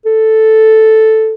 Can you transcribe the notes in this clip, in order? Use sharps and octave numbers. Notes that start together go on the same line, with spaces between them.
A4